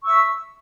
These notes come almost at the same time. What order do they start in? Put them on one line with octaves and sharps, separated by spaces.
C#6 E6 E5